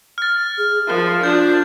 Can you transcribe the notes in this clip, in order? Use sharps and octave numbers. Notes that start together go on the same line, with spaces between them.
F6 A6
G#4
F3 A#4
D4 F4 G6